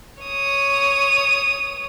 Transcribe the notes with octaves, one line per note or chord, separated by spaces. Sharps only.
C#5 D#6